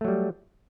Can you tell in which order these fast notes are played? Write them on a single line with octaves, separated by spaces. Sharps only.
A3 F#3 G3